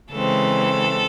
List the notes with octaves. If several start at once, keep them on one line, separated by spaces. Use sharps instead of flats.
C#3 E3 G#3 C4 A4